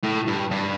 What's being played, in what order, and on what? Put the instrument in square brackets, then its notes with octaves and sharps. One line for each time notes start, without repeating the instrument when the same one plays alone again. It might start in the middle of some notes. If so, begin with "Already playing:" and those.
[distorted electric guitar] A2
G2
G2